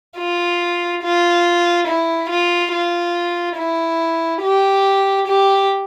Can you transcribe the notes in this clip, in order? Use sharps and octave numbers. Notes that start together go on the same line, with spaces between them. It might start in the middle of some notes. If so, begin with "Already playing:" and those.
F4
F4
E4
F4
F4
E4
G4
G4